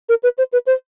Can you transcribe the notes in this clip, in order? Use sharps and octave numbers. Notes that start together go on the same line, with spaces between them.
A#4
B4
C5
B4
C5